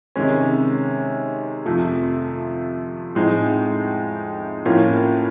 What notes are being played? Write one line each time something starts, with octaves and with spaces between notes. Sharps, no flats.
C3 D#3 G#3 C#4
F2 C3 F3 A3
A2 F3 G#3 C4 D#4
A2 F3 A#3 C#4 F4